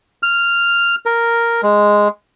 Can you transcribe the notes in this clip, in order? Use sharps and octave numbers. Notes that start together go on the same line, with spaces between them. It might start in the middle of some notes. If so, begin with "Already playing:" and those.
F6
A#4
G#3